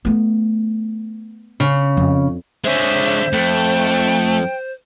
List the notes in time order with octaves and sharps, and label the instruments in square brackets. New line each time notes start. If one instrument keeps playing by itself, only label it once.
[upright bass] A3 B3
[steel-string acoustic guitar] C#3
[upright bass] F2
[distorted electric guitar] D3 G#4 [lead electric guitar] G#3 C#5 [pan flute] C5 [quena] E5
[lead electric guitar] F2 [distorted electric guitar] A3 [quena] G5